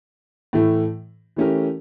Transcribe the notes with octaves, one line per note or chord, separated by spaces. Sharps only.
A2 E3 A3
E3 A3 C#4 G4 A#4